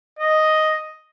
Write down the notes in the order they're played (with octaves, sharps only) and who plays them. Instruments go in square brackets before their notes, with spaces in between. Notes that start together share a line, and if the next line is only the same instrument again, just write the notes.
[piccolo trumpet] D#5